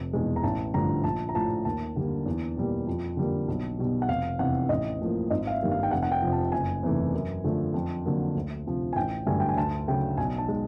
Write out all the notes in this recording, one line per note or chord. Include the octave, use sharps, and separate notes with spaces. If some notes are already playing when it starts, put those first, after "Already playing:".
Already playing: F1
E2 B2 G#3
A#5
A1 A5
G2 D3 F3 A3 A#5
A#1 A5
A#5
A2 F3 A5
D#2 A5
D3 G3 A#3
E2
B2 G3 A#3
F2
D3 G3 A#3
B1
B2 G3
F#5
F1 F5
E2 C3 F#5
A1 D#5
A2 F3 A#3
G#1 D#5
F5
E5
G2 D#3 G3 A#3
F5
G5
F1 F#5
F#5
G5
F2 C3 F3
A5
F#1 G#5
E2 C3 E3 A3
F#2
D3 F3 A3
F2
D3 F#3 A#3
D2
C3 F3
G#5
A1 G5
G2 D3 F#3 A3 G#5
G5
G#5
D2 A5
C#3 F#3 A3 G5
B1 G#5
A5
G#3